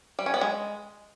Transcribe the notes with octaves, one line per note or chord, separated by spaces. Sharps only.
G3
C#4
B3
G#3